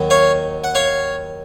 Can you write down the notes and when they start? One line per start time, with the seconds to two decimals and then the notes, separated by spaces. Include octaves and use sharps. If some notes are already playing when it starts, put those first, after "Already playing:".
Already playing: D#2 D#3 F#3
0.10 C#5 F5
0.64 F#5
0.75 C#5 F5